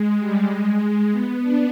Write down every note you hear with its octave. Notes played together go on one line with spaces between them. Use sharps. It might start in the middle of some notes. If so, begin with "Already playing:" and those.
Already playing: G#3
G3
G#3
B3
D4